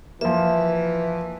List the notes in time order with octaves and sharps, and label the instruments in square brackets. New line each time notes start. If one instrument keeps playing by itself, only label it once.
[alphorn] E3 [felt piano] F3 A#3 [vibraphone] E5